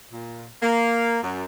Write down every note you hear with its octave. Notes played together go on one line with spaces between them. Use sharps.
A#2
A#3
F#2